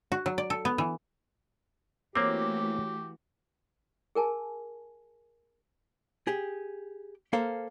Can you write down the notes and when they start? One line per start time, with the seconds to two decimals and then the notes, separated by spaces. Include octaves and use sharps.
0.12 F#4
0.26 F#3
0.38 D5
0.50 A4
0.65 B3
0.78 E3
2.15 E3 A3 A#3 C4 F#4 G4 C#5 D6
4.15 G#4 A#4 G#5 A5
6.27 G4 G#4
7.33 A#3 A4 C5 F5